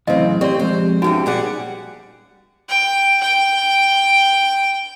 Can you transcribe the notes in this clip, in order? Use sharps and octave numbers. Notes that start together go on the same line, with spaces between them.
F#2 A2 C#3 E3 C4 D#5
C4 G4 A4 D5 C6
F3 G#3 C4 C5
E2 G2 E3 C#4 D#4 F#4 G4
A#2 G3 G4 G#4 D5 F#5
G5
G5